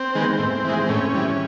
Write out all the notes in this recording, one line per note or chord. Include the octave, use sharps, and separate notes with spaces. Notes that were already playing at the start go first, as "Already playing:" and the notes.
Already playing: C4
D#3 G#3 B3
A2
E3 G#3
C4
A2 C#4
E3 G3